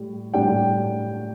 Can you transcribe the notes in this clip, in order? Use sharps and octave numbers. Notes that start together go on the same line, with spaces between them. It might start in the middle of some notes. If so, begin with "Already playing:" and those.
Already playing: A2 G3
A2 G3 D4 G5